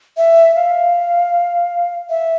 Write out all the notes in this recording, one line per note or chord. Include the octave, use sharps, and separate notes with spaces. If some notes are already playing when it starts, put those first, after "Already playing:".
E5
F5
E5